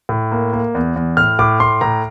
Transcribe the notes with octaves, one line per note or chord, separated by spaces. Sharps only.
A2
A#3
A#3
E2
E2
A2 F6
A2 D6
A2 C6
A2 A#5